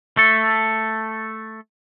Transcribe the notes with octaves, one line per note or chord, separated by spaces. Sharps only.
A3 A4